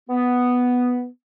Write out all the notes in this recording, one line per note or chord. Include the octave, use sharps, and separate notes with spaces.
B3